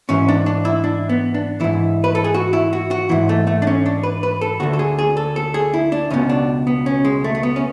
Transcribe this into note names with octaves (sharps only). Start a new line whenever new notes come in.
G#2 E3 C#4
D4
D4
E4
D4
B3
D4
G#2 E3 E4
B4
A4
G#4
F#4
E4
F#4
F#4
G#2 E3 E4
A3
A3
D4
C#4
D4
B4
B4
A4
D2 D3 F#4
A4
G#4
G#4
A4
A4
G#4
E4
D4
C#2 B2 C#4
D4
B3
C#4
G#3
A3
A3
B3
C#4